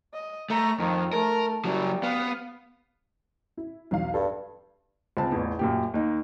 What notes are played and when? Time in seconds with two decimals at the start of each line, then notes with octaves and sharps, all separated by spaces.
0.13 D#5
0.50 A3 A#5
0.79 F2 D#3
1.13 A3 A#4
1.65 C#3 F#3 G3
2.03 B3 F5
3.58 E4
3.91 B1 E2 F5
4.14 G2 A4
5.17 C#2 C4 A5
5.32 A1 E2
5.59 F#2 A#2 G4
5.94 D#2 D#4